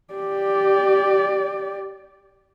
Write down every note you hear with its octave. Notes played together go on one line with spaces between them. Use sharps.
G4 D5